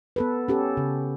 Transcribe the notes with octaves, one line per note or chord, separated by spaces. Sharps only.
B3 A4 B4
C#4 G4 A4
C#3